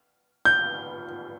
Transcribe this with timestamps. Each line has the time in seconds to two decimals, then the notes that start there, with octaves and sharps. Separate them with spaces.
0.45 G6